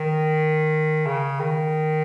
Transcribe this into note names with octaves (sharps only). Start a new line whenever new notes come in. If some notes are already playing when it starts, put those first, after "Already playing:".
Already playing: D#3
C#3
D#3